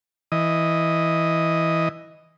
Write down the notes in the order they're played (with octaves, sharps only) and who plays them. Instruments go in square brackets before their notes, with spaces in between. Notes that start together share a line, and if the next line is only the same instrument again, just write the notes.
[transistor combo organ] E3 D#5